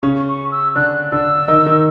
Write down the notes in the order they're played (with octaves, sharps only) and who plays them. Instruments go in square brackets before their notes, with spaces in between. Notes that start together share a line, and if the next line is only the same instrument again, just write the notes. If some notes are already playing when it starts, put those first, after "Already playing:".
[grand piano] C#3 C#4 [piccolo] C#6
[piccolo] C#6
E6
[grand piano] D3 D4 [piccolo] F#6
[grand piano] D3 D4 [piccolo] E6
[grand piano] D#3 D#4
D#3 D#4